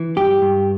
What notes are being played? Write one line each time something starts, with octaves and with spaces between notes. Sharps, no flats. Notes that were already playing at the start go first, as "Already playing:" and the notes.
Already playing: E3
G2 G4
G2